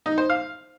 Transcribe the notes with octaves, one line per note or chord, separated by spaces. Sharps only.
D#4
C5
F5